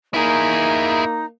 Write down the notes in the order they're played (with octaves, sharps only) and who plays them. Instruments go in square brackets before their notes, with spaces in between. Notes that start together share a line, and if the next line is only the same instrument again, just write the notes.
[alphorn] A#3 [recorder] D#4 [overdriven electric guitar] E4 G#4